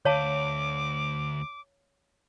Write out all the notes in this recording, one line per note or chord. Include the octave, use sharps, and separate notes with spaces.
D2 C#5 F5 A5 D6